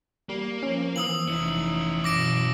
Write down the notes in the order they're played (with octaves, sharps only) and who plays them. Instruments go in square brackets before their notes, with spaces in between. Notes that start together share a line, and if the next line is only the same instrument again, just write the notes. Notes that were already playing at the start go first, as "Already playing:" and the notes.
[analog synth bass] G3 [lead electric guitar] A#3
[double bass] F3 [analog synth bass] C#4
[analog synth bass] E3 [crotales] D#6 E6 F#7
[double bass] F1 D#4 [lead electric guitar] C#4 E4
[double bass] F#2 B2 [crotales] D6 A#6 D7